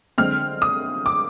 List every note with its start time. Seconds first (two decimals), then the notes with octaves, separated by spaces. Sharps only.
0.18 D3 G#3 C4 F6
0.62 D#6
1.06 D6